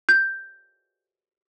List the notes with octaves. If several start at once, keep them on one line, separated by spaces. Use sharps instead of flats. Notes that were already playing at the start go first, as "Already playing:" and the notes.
G6